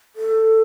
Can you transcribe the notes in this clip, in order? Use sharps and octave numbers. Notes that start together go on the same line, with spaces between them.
A4